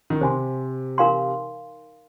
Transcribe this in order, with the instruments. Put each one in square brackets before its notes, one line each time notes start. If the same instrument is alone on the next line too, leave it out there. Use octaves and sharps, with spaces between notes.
[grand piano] D#3
[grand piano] C3 [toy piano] C5 G#5 C6
[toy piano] D#4 A#4 F5 G#5 C6